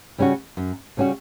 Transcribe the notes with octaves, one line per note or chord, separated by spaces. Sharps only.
C#3 G3 C#4 F#4
F#2
C#3 G3 C#4 F#4